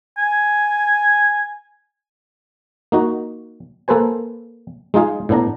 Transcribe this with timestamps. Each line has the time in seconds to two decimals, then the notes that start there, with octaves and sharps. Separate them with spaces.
0.18 G#5
2.92 A#3 D#4 F#4
3.88 A#3 A4 B4 C5 G#5
4.94 G#3 D#4 F4 G#4 F5
5.29 A2 B3 D4 A#5